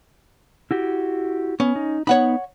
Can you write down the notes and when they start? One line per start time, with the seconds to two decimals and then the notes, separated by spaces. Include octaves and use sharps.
0.71 E4 F#4 G4
1.60 B3 C#4
1.75 D#4
2.07 B3 D#4 C#5 F#5 B5